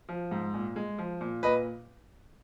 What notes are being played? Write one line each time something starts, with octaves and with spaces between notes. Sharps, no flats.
F3
G#2
A#2
G#3
F3
A#2
A#2 B4 D#5